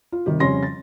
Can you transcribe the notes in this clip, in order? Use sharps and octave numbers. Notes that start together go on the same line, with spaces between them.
F4
C3 D#3 G3 G4
F2 C#3 G3 C#4 C6 A#6
A6